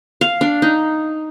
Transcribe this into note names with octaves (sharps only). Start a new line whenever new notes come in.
F5
D4
D#4